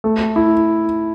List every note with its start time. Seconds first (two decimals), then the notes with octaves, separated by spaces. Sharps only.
0.04 A3
0.36 E4